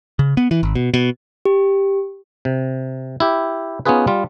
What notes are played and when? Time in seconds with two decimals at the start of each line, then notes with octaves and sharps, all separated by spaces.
0.19 C#3
0.37 B3
0.51 E3
0.63 G#1
0.75 B2
0.94 B2
1.45 G4
2.45 C3
3.20 E4 G4
3.86 B3 C#4 D#4 F4 G#4 B4
4.07 G3 F4